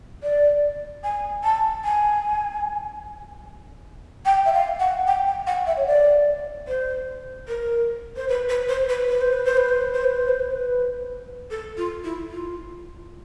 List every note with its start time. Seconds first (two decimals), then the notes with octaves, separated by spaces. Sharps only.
0.23 D5
1.04 G#5
1.44 A5
1.84 G#5
4.25 G5
4.46 E5
4.53 F5
4.79 F#5
5.07 G5
5.27 G5
5.47 F#5
5.67 E5
5.77 C#5
5.87 D5
6.68 C5
7.48 A#4
8.17 C5
8.29 B4
8.49 B4
8.69 C5
8.89 B4
9.09 B4
9.21 C5
9.33 B4
9.45 C5
9.57 B4
9.69 C5
9.81 B4
9.93 C5
10.04 B4
10.16 C5
10.28 B4
10.40 C5
10.52 B4
11.51 A4
11.77 F4
12.04 E4
12.31 F4